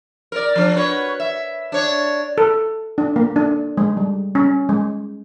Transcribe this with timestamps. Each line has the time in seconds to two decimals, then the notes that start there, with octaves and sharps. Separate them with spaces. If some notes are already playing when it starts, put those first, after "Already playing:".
0.32 A#4 D5
0.56 F3 D4
0.76 F#4 B4 C#5
1.20 E5
1.72 D4 C#5
2.38 A4
2.98 D4
3.16 A#3
3.36 D4
3.77 G#3
3.97 G3
4.35 C#4
4.69 G#3